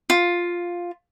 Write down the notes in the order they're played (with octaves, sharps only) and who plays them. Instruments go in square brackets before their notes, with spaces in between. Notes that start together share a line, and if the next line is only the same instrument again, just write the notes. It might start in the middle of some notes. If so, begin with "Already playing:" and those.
[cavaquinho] F4